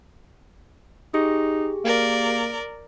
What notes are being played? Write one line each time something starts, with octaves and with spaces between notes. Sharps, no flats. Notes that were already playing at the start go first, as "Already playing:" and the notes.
D#4 G4 G#4
A#3 A#4 D5